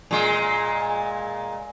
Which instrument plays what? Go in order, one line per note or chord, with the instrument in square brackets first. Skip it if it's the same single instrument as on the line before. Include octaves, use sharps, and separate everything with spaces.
[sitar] A#2 G#3